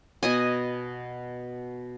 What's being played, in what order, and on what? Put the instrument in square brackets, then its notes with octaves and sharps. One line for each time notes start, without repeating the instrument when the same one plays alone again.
[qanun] B2 D#5 G#5